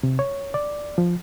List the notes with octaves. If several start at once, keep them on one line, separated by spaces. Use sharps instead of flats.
C3
C#5
D5
F3